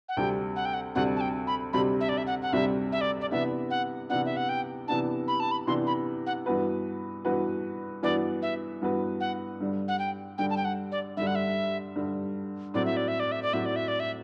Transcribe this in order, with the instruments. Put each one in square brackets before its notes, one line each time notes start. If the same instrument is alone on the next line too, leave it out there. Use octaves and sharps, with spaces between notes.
[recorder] F#5
[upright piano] D2 C3 G3 C4 G4 [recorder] G5
[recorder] F#5
G5
F#5
[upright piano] D2 C3 G3 C4 G4 [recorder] F#5
[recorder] A5
G5
B5
[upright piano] D2 C3 G3 C4 G4 [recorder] B5
[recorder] E5
D5
E5
F#5
F#5
[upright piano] D2 C3 G3 C4 G4 [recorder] E5
[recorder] E5
D5
D5
[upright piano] C3 E3 B3 D4 [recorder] E5
[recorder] F#5
[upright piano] C3 E3 B3 D4 [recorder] F#5
[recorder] E5
F#5
G5
[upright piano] C3 E3 B3 D4 [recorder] A5
[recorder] B5
A5
B5
[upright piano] C3 E3 B3 D4 [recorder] C6
[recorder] B5
F#5
[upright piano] G2 E3 B3 F#4 B4
G2 E3 B3 F#4 B4
[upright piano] G2 E3 B3 F#4 B4 [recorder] D5
[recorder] E5
[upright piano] G2 E3 B3 F#4 B4
[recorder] F#5
[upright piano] G2 D3 G3
[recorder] F#5
G5
[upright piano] G2 D3 G3 [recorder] G5
[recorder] A5
G5
F#5
D5
[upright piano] G2 D3 G3 [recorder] E5
[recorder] F#5
E5
[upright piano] G2 D3 G3
[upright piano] A2 F#3 C4 [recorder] D5
[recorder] E5
D5
E5
D5
E5
D5
[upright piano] A2 F#3 C4 [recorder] E5
[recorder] D5
E5
D5
E5